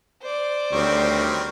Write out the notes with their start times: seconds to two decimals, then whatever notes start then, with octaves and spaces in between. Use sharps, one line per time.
0.22 C5 D5
0.73 D2 D#3 G3 C4 C#5